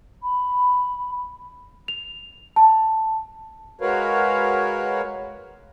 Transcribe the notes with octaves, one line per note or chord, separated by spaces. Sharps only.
B5
F7
A5
G#3 F#4 A#4 B4 C#5 F5